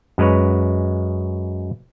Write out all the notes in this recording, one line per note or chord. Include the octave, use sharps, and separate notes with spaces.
F#2 G#3 B4 C#5